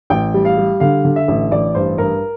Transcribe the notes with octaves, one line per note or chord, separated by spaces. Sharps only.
A1 G5
G3
F5
G3
D3 F5
D3
E5
A1
A1 D5
G2 C5
G2 A#4